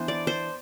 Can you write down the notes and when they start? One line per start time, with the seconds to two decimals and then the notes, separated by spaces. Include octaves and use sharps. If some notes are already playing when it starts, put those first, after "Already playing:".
Already playing: E3 B3 D4 C5
0.08 D5
0.27 C5